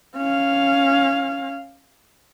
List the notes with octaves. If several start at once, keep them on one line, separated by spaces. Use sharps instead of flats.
C#4 F5